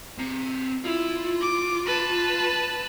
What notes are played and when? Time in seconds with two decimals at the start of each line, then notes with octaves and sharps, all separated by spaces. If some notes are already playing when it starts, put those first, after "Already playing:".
0.18 C4 A#5
0.84 E4 F4
1.41 D6
1.86 B4 A5